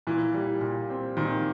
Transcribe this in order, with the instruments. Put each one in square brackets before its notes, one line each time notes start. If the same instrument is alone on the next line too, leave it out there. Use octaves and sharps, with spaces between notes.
[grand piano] A#2 [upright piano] E3
[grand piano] G3
A#2
C4
[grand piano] A#2 [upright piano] D#3